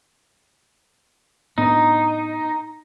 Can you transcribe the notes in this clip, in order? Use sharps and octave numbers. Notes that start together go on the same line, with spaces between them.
A2 B3 D4 D#4